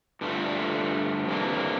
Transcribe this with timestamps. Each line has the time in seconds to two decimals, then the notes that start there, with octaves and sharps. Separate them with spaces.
0.21 G2 D3 A3 D4 F4
1.28 F2 C3 E3 A#3 D4